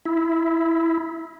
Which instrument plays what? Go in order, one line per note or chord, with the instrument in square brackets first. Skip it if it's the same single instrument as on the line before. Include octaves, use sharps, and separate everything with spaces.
[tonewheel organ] E4